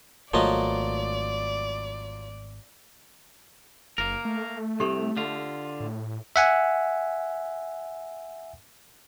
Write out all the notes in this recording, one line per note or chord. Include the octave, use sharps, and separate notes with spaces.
G#1 F3 F#3 A3 A#3 D5 D#5
F#1 A#3 A#4
A3
C2 C3 G4 A4 C#6
D3 F4
A2
E5 F#5 G#5